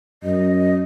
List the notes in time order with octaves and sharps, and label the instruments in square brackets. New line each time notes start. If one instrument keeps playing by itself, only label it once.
[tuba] F#2 [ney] D#5